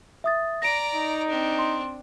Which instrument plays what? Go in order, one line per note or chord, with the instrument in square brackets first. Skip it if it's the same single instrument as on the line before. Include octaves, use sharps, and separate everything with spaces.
[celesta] E5 D#6 A6
[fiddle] D5 A#5 [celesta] A#6 D7
[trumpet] D#4
[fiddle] C4 D4
[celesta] C6